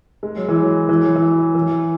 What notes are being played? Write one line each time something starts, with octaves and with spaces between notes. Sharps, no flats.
G#3
F#3
E3
F#3
E3
F#3
E3
E3